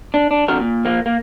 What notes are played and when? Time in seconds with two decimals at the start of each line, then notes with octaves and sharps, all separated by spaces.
0.14 D4
0.31 D4
0.48 F2 D3 F#4 A#4
0.60 A#2
0.85 F3 A#3
1.06 A#3